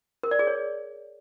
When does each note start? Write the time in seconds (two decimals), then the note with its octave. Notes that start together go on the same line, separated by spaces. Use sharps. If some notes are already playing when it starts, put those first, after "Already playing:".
0.23 A#4
0.31 D5
0.39 G#4
0.47 C#5